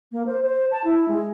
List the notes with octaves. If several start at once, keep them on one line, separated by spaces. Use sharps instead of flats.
A#3
C5
C5
A5
E4
G#3